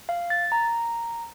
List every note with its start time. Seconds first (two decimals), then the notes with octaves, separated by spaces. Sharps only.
0.09 F5
0.30 A6
0.52 A#5